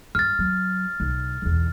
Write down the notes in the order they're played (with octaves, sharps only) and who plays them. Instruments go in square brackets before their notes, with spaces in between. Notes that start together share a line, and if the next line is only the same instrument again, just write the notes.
[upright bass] G2 [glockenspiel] F6 A6
[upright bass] F#3
B1
B1 E2